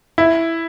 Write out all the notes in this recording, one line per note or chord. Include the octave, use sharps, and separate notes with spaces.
E4